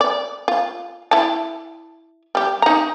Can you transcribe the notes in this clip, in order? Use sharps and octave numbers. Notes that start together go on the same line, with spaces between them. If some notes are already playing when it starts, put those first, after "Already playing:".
D5
F4
E4 A5
G3 G4
D#4 A#5